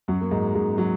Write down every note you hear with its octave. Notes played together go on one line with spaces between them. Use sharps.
F#2 F#3
A#3
G#2 G#3
G#2 G#3
F#3